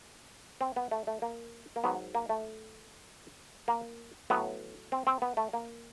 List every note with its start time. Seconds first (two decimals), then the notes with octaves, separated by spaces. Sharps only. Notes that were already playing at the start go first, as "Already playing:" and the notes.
0.61 C4
0.76 B3
0.91 A3
1.07 A3
1.22 A#3
1.76 A#3
1.84 G#2 D#3 F#3 B3
2.15 A#3
2.29 A3
3.68 A#3
4.30 A2 F#3 B3
4.92 C4
5.07 C4
5.22 B3
5.37 A3
5.53 A#3